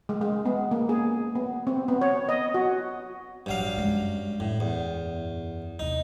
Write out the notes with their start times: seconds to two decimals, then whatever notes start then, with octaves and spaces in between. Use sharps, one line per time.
0.09 G#3
0.21 G#3
0.45 B3
0.71 A#3
0.89 G#4
1.35 B3
1.67 C4
1.88 B3
2.01 C#5
2.29 D#5
2.54 F#4
3.46 A1 G2 F3 F#3 F5
3.77 F#2 G#3
4.40 F#2 A2
4.60 E2
5.79 D#2 C3 D#4